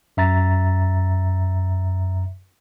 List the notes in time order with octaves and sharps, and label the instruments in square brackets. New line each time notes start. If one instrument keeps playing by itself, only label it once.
[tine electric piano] F#2 E5 A#5 A6